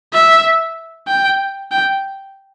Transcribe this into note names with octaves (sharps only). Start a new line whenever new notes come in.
E5
G5
G5